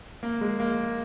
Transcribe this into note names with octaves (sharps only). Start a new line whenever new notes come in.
A#3
G#3
A#3